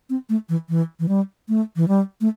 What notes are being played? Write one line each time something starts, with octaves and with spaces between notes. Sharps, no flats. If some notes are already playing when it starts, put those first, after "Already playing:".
C4
A3
E3
E3
E3
G3
A3
E3
G3
A3